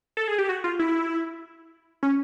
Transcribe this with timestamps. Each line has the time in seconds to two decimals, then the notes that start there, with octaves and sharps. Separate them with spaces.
0.17 A4
0.28 G#4
0.38 G4
0.49 F#4
0.64 F4
0.79 E4
2.03 C#4